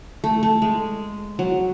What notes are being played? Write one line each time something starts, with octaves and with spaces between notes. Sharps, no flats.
A3
A3
G#3
F#3